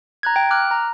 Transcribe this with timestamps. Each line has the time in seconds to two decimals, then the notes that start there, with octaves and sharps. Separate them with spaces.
0.23 A#5 F#6 G#6
0.36 G5
0.51 D6 F6 F#6
0.71 A#5